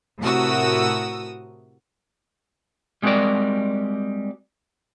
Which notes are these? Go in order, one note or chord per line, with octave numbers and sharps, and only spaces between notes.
A2 C3 F#4 A#4 D#6 E6
G3 G#3 C4 F#4 A#4 D5